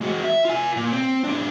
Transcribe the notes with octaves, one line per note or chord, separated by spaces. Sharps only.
G#3 F#4
E5
F4 G#5
A#2
C4
G#2 D4